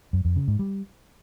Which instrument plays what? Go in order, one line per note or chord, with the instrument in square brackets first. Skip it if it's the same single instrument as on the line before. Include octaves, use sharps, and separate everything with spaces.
[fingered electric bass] F#2
F2
C#3
G#2
G3